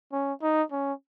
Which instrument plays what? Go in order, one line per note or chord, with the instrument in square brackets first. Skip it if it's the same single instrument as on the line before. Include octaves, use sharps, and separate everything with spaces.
[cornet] C#4
D#4
C#4